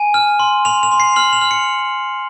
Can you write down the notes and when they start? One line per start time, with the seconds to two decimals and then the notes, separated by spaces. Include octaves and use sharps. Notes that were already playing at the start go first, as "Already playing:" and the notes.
Already playing: G#5 D#7
0.14 F6
0.40 C6
0.65 C6 F7
0.83 F7
0.92 C6
1.00 C7
1.16 F6 F#7
1.33 F7
1.42 F6
1.51 C#7